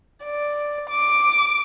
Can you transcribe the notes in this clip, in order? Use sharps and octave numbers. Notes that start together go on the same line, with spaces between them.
D5
D6